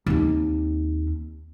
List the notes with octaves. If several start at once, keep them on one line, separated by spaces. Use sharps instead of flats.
D#2 C4